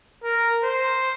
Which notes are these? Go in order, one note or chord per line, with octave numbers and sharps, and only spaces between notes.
A#4
C5